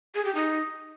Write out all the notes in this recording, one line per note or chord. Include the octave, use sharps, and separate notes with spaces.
G#4
G4
D#4